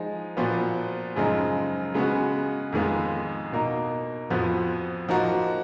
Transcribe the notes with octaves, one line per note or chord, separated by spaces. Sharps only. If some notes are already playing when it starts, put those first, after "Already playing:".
Already playing: F3 G#3 D#4
A#2 F3 B3 F#4
F#2 C#3 F3 G#3 D#4
C#3 G#3 B3 F#4
F2 D#3 G#3 B3 F4
B2 A#3 D#4
F2 F3 B3 F#4
F3 A#3 D#4 F#4